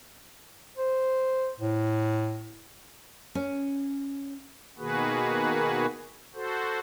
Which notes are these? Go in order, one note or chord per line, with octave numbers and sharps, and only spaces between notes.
C5
A2
C#4
B2 D#3 A#3 F#4 G#4 B4
F#4 A4 C5